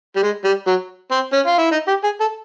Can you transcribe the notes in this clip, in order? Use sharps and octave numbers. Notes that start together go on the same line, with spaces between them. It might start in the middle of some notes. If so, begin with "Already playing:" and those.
G3
G#3
G3
F#3
C4
C#4
F4
E4
D#4
G4
G#4
A4